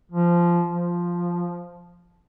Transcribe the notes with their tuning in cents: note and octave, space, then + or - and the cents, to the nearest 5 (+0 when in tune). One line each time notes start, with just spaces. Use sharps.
F3 -15
F3 +0